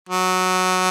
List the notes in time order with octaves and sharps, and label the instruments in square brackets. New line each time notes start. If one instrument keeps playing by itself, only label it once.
[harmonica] F#3